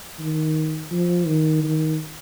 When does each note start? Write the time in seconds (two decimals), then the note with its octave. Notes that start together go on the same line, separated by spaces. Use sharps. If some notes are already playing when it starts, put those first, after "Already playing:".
0.19 D#3
0.91 F3
1.27 D#3
1.63 D#3